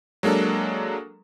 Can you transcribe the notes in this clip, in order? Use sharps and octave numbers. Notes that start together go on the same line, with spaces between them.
F#3 G#3 A#3 D4 A4